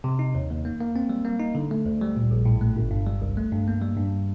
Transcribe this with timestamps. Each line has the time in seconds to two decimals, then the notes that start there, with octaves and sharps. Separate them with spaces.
0.04 C3
0.19 D#4
0.35 D#2
0.50 D#2
0.65 A#3
0.80 A#3
0.96 C4
1.10 G3
1.25 A#3
1.40 D#4
1.55 D3
1.71 A3
1.86 D2
2.01 G3
2.16 A#2
2.31 A#1
2.45 A2
2.61 A3
2.76 G1
2.91 G2
3.07 G3
3.22 C2
3.37 A3
3.52 G2
3.68 A#3
3.82 G3
3.97 G2